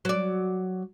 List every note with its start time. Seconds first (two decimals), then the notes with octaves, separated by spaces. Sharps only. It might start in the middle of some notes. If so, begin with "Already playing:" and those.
0.05 F#3 D5